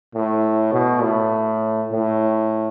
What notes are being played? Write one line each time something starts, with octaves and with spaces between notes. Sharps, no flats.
A2
B2
A2
A2